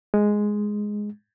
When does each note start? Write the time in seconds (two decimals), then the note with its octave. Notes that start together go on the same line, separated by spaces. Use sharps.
0.14 G#3